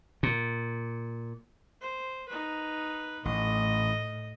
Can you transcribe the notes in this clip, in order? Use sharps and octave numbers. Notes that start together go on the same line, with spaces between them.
A#2
C5
D#4 B4
A1 A2 D#5